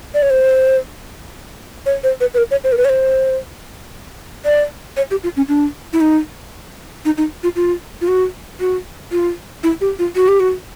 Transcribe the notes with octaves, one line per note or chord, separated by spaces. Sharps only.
D5
C#5
C5
C#5
C5
B4
B4
A#4
C#5
C5
A#4
B4
C#5
C5
D5
C#5
G4
F4
C#4
D4
E4
D#4
D#4
D#4
F4
F4
F4
F#4
F#4
F4
E4
G4
F4
F#4
G4
F#4